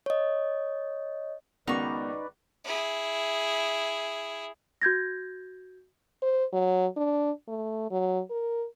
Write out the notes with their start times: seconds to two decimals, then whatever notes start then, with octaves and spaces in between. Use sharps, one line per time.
0.06 C#5 D#5
1.67 C#2 D#3 B3 D#4 F#4 B4 D5 C#6
2.64 E4 G#4
4.82 F#4 G6 G#6 A#6
6.22 C5
6.53 F#3
6.97 D4
7.48 A3
7.91 F#3
8.30 A#4